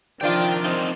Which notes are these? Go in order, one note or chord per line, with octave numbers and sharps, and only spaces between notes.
C3 D#3 F3 D4 F4 G5
C4 D#4